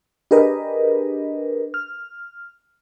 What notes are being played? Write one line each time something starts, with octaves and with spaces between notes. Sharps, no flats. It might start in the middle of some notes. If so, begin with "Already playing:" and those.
D4 G4 G#4 A#4 B4 D#5
F6